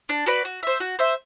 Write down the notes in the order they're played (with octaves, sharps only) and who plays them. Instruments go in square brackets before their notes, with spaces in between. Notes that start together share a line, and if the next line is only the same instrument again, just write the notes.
[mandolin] D4
F#4 B4 D5
F#4
C5 E5
F#4
C5 E5